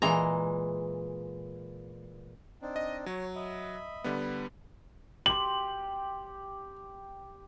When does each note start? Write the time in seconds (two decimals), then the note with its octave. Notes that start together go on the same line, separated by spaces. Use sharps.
0.02 A#2 E3 G#3 A#5
2.62 C4 D4 D#4
2.76 D#5
3.06 F#3 C#5
3.36 D#5 E5 B5
4.04 D3 G3 B3
5.26 G4 C6 F#7